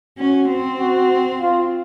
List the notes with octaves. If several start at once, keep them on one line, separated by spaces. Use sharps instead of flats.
C#4 F#4
C4
F#4
F4